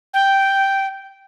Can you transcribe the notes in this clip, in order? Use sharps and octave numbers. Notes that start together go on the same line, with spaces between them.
G5